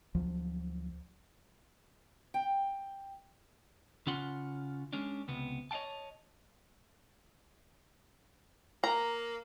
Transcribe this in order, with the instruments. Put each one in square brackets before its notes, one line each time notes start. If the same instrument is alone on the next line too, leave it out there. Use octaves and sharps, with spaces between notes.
[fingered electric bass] D2 F3 F#3
[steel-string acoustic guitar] G5
[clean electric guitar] C#3 C#4 F4 F#5 C6
G#3 C#4 D4
C#2 C3 B3
C#5 D#5 F5 G5 A5
[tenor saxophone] A#3 [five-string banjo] A#5